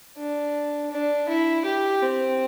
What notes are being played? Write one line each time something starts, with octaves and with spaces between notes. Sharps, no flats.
D4
D4
E4
G4
C4